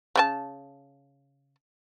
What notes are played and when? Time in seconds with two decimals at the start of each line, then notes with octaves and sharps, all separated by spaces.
0.16 C#3 D4 A5